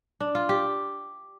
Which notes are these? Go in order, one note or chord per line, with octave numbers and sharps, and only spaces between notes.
D4
F4
G4